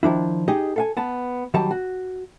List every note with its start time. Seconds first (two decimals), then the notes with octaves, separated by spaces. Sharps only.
0.03 D#3 F3 D4 E4
0.48 D#4 G4 G#4 D#5
0.76 A4 F5 G#5
0.97 B3 A5
1.54 D#3 F#3 G3 A5
1.71 F#4